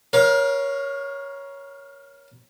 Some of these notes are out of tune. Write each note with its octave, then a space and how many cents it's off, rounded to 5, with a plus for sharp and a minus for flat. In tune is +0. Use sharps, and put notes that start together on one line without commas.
A#4 +30 C#5 +0 F5 +0